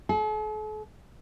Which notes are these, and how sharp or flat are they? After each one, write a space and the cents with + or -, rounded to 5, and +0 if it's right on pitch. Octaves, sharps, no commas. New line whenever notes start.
A4 -45